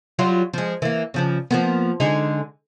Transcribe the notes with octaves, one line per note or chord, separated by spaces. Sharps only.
F#3 G3 F4
F3 G#3
E3 A#3
C#3 F3 D4
F3 A#3 B3
D3 G#3 D#4